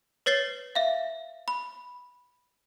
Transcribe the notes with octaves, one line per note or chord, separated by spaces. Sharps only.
B4 C#5 A6 C7 G7
E5 F5
B5